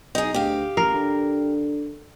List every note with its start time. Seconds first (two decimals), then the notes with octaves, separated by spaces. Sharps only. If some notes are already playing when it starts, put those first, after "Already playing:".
0.15 B1 D#4 G#4
0.34 D2 G4 F5
0.77 A1 A#4
0.94 D3